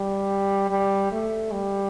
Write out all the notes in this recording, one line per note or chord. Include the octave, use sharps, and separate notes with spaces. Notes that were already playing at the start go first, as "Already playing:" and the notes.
Already playing: G3
G3
A3
G3